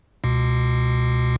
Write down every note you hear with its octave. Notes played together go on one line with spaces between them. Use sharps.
C#2 B2